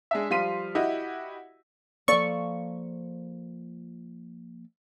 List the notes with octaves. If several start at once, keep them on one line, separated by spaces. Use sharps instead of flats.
G#3 D4 E5
F3 G3 F5 C6 B6 D#7
E4 F#4 G4 D#5
F3 A#3 A4 D5 C#6